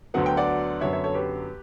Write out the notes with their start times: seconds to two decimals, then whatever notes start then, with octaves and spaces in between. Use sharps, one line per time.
0.14 D2 D3 F#3 B3 F#5
0.26 G5
0.37 D5 F#5
0.81 F#2 D3 F#3 B3 C#5 E5
0.93 C#5 E5
1.04 A4 C#5
1.14 G4 B4